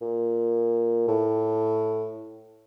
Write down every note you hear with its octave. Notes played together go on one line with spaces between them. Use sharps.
A#2
A2